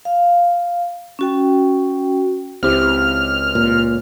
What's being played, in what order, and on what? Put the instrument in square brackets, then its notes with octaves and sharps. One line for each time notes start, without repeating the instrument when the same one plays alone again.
[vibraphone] F5
C#4 F#4 G5
[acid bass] C#2 [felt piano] C4 E4 G4 [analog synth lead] F6
[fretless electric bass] A#2